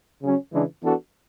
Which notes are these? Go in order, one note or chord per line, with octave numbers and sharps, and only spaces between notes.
C#3 F#3 C#4
C#3 E3 G#3 D4
E3 B3 D4 F#4 A4